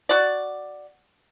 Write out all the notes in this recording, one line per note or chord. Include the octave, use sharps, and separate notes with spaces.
F#4 D5